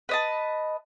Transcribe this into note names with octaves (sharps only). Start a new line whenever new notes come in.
B4 D#5 A5